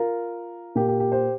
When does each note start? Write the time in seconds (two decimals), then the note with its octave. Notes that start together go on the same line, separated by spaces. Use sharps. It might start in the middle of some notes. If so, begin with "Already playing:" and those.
Already playing: F4 A#4
0.75 A#2 A#3 G4
0.88 G4
1.00 G4
1.12 G4 C5